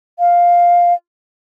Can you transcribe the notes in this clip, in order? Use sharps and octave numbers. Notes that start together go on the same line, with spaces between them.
F5